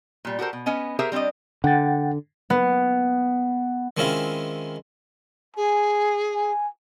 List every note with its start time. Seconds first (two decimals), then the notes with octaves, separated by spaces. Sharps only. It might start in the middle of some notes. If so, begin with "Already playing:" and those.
0.25 A#2 G3
0.39 F#4 G4 A4 A#4 C5
0.53 B2
0.66 B3 C#4 D#5 G#5
0.99 G4 G#4 A#4 C5 E5
1.12 G3 C4 D4 D5 D#5
1.64 D3 F#5 G5 A6
2.50 B3
3.97 D#3 G#3 C4 C#4 E4 F4
5.56 G#4 G#5
6.33 G#5